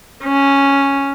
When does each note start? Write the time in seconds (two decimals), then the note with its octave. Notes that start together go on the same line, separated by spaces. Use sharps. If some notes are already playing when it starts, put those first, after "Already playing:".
0.24 C#4